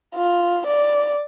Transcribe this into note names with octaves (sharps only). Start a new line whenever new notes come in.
F4
D5